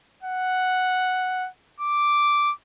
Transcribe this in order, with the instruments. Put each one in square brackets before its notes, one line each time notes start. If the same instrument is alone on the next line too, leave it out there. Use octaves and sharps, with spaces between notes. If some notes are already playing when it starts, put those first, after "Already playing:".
[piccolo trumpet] F#5
D6